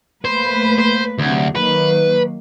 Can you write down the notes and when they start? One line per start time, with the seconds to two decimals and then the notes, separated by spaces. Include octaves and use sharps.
0.25 A3 A#3 B4 C5
0.78 C5
1.18 D2 C3 F#3
1.55 D#3 F#3 A#3 B4